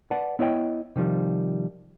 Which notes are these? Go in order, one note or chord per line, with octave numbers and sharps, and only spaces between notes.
B4 D5 F#5 A5
B3 E4 C#5 D#5 G5
C3 D#3 F3 G3